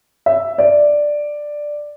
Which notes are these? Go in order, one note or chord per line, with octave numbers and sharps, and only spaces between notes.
E5
D5